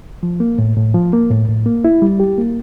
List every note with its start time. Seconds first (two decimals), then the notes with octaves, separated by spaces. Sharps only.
0.23 F3
0.40 A#3
0.58 A2
0.76 A2
0.94 F3
1.13 A#3
1.31 A2
1.48 A2
1.66 A#3
1.84 E4
2.02 G3
2.20 G4
2.38 A#3